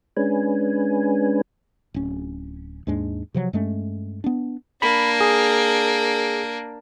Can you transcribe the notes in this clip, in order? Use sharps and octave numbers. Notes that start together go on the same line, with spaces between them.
G#3 C#4 D4 B4 G#5
D1 C#4
D#2 G#2 G#3 D4
C3 F3 F#3
G2 G#3 A3 C#4
B3 D4
A#3 D4 B5
G#4